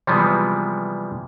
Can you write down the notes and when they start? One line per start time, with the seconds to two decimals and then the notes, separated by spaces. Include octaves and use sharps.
0.07 C3 E3 F3 G3 G#3 B3